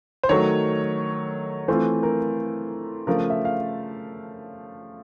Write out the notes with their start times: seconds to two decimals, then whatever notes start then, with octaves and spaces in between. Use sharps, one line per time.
0.23 C5
0.29 D#3 F#3 A3 C#5
1.68 E3 A3 C4 F4 C5
2.03 A#4
3.07 C#3 F3 A3 A#4
3.30 E5
3.45 F5